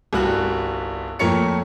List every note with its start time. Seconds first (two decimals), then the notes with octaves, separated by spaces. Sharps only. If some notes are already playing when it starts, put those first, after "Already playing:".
0.13 G1 C2 G3 F#4 F#6
1.19 F2 A#2 A3 A#4 C#5 C#7